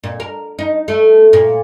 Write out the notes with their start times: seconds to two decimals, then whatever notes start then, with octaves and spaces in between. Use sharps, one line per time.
0.03 A#2
0.20 A#4
0.59 D#4
0.88 A3
1.33 A#2